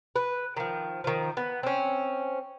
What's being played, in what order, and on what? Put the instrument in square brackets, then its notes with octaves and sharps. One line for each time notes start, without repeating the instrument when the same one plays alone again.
[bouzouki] B4
D#3 F3
D#3 F3
B3
C4 C#4